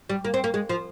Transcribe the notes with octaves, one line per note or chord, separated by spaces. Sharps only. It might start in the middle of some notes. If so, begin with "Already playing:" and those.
G3
A#3
C4
A#3
G#3
F3